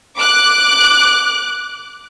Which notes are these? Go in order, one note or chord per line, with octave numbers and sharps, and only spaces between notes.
D6 F#6